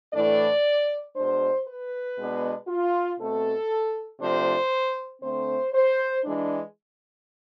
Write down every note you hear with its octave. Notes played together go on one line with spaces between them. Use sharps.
A2 E3 A3 D4 D5
B2 G#3 D4 C5
B4
B2 G#3 B3 D4
F4
B2 A3 C4 A4
C3 F3 A3 D4 C5
D3 A3 C4 C5
C5
E3 G#3 D4